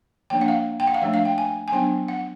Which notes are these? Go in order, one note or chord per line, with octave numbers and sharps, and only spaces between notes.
F3 A#3 D4 G5
F#5
F5
G5
F#5
F5
F3 A3 D4 E5
F5
G5
G#5
G#5
F#3 B3 D4 G5
F#5